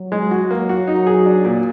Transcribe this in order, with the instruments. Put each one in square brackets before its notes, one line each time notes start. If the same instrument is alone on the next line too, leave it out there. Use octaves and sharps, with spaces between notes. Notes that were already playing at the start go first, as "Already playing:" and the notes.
Already playing: [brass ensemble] F#3
[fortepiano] G#3
F#4
[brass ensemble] F#3 [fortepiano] A#3
[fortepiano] F#4
D#4
G#4
D4
A#2